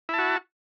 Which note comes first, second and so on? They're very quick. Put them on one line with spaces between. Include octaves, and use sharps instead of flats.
E4 A5 F#4